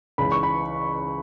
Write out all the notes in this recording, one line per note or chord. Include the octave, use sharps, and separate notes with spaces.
C#2 C#3 E3 B5
C#6
B5